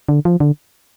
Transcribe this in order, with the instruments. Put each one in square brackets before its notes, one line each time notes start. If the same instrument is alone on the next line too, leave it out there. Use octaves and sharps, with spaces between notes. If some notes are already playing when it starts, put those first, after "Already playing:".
[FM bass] D3
F3
D3